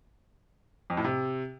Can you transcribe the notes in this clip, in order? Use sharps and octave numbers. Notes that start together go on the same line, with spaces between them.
F2
A2
C3